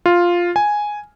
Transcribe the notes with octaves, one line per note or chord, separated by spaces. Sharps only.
F4
G#5